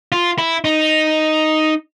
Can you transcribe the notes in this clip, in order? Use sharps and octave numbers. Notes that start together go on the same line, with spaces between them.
F4
E4
D#4